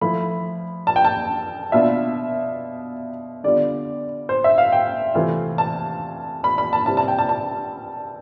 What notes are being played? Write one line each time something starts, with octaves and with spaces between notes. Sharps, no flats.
F3 A3 E4 B5
A5
G5
A5
B2 B3 D4 F4 E5
D3 G3 B3 F4 D5
C5
E5
F5
G5
C3 E3 A3 C4 F4
A5
B5
B5
A5
C3 G3 C4 E4 A5
A5
G5
A5
A5